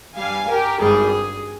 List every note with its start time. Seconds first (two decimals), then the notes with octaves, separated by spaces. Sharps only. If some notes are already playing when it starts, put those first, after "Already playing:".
0.17 G2 G3 F5 G#5
0.48 G4 A#4
0.79 G#1 G2 G3 G#4